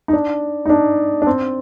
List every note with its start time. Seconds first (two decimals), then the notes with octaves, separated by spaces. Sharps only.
0.08 D#4
0.13 D4
0.66 D#4
0.70 D4
1.22 D4
1.27 C4